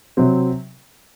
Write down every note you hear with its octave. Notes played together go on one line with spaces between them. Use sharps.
C3 F#3 C4